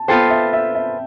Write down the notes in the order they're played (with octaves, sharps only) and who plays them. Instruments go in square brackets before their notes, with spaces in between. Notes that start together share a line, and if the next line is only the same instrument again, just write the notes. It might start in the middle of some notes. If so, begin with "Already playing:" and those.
Already playing: [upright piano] A5
[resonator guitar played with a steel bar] B3 F4 A4 C5 [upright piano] G5
[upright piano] E5
E5
E5